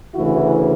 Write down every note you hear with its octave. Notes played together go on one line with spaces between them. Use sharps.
D2 C#3 E3 E4 F#4